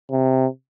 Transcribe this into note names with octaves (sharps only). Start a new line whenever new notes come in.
C3